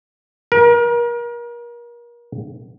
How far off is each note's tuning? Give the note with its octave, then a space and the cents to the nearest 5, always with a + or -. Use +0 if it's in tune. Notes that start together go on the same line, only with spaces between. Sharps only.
A#4 +35